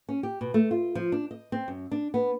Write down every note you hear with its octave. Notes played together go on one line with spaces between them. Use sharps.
C#4
G4
B2
A3
F4
F3
D4
D#5
C4
F#2
D4
B3